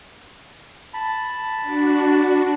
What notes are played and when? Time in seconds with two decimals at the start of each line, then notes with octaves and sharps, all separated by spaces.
0.94 A5 B5
1.61 D4 F#4